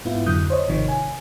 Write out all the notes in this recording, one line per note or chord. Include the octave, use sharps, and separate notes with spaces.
G#2 B3 E4 F4
F2 D3 F#3 D#6 F#6 G6
C5 C#5 D#5
G#1 C3 D#3 F3 C#5
G#5